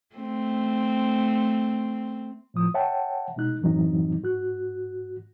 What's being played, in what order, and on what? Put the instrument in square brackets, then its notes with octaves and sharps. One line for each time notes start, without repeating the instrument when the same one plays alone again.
[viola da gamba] A3 C4
[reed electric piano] A2 F3 D#6
C#5 E5 F#5 G5 A5
B2 G#3 D#4 F#6
F#2 A2 E3 F#3 C4 D#4
G#2 F#4 F#6